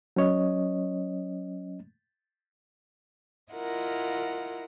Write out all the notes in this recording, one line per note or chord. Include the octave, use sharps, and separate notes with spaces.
F#3 C#4 C#5 D#5
E4 F4 A#4 D#5 F#5